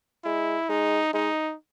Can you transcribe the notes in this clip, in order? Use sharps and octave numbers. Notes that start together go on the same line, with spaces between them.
G#3 E4
G#3 D#4
G#3 D#4